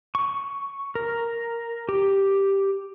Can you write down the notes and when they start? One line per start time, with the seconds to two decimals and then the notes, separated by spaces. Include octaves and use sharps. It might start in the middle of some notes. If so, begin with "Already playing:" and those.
0.15 C#6
0.95 A#4
1.89 G4